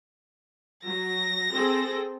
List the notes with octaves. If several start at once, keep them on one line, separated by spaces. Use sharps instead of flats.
F#3 A#6
C4 G#4 A4